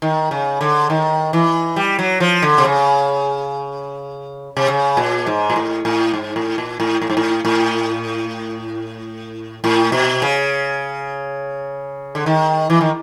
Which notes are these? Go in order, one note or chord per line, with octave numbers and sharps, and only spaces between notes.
D#3
C#3
D3
D#3
E3
G3
F#3
F3
D3
C3
C#3
C3
C#3
A#2
G#2
A#2
A2
A2
G#2
A2
A#2
A2
A2
G#2
A2
A2
A2
B2
C#3
D3
D#3
E3
D#3